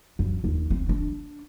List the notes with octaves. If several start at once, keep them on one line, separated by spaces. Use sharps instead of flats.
F#2
D#2
C4
D4